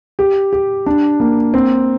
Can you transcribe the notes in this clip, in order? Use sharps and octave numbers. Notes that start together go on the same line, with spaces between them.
G4
G4
D4
A#3
C4